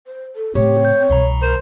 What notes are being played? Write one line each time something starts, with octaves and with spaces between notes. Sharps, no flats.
C5
A4
A2 C#3 C4 G4 C#5
G6
C2 B2 E3 A#5
A#4 C5